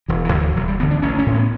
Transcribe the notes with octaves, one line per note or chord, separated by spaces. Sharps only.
E1 E3
E3
D2 D3
E3
E1 F#3
G3
D2 D3 B3
D4
A1 C#4
C#4
A2
B3